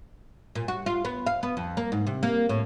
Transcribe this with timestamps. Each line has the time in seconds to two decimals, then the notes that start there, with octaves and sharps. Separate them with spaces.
0.55 A#2
0.68 F#4
0.86 F4
1.05 B3
1.26 F5
1.43 B3
1.57 F2
1.77 A#3
1.92 G#2
2.07 C3
2.23 A#3
2.49 A2